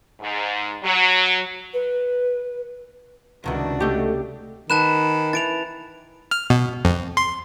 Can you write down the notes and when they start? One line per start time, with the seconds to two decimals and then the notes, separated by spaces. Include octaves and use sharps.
0.20 G#2
0.84 F#3
1.73 B4
3.44 C#2 G2 C3 D#3 E3 D4 F#4
3.80 A3 G4 D#5
4.70 D#3 B4 A5 F#6 E7
5.33 E3 A6 D7 F7
6.31 F6
6.50 B2
6.85 F2
7.17 C6